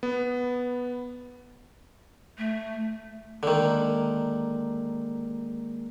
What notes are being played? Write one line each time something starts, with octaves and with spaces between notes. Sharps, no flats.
B3
A3
D3 D#3 G#3 A#3 G#4